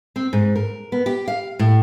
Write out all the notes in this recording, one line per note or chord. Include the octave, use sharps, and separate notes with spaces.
C4
G#2
A#4
B3
G4
F5
A2